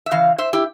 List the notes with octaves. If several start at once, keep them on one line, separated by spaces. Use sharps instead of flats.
E5
C#3 E3 F5
C5 E5
E4 G4